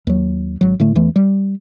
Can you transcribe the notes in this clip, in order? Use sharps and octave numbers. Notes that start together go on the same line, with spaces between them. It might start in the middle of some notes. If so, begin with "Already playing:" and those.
D#2 F#3
G#1 F#3
A2 D3 A3
E2 E3 A3
G3